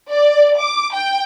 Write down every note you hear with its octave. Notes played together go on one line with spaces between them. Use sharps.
D5
D6
G5